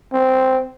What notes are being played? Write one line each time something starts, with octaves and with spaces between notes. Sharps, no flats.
C4